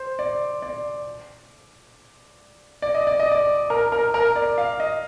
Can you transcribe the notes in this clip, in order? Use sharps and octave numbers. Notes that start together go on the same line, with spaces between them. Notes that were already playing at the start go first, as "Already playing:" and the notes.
Already playing: C5
D5
D5
D5
D#5
D5
D#5
D5
A#4
A#4
A#4
D5
F5
D#5